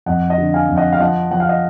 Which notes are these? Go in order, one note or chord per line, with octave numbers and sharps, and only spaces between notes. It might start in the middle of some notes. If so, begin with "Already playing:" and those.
F2 D#5 F#5
D#5 F#5
D3
F5 G#5
F2
D#5 F#5
F5
F3 D#5 F#5
F3 F#5
F5
D#5 F#5